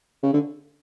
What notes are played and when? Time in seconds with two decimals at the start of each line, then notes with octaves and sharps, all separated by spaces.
0.23 C#3
0.33 D3